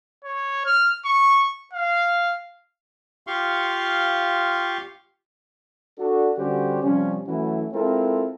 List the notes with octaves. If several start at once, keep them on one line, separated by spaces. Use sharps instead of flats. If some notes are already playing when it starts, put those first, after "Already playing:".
C#5
F6
C#6
F5
F4 G4 F5 C6 C#6
D4 F#4 A4
D3 G3 C#4 F#4 G4 C5
C3 F3 G3 C#4
E3 F#3 A3 C#4 E4 F#4
G#3 C4 E4 F4 A4 A#4